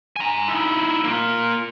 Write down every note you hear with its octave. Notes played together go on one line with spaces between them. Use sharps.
G#5 A#5
D#4 E4
A#3 F4